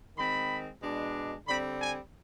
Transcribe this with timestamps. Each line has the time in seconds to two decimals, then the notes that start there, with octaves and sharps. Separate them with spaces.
0.17 D#3 G#3 C4 B5
0.82 B2 G#3 D4
1.47 D3 G3 C4 B5
1.80 G#5